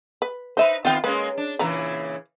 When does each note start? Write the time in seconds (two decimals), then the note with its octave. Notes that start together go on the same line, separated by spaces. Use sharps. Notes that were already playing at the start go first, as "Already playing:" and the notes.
0.22 B4
0.57 D#4 B4 C5 E5
0.85 D#3 B3 C4 F4 G5
1.04 G#3 A#3 C#4 B4
1.38 D4
1.59 A#2 C#3 E3 B4 A#5